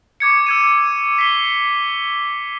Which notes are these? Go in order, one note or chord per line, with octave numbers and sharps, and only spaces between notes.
C#6 D6 G#6 C#7
E6 G#6 D#7
B6 C7 G7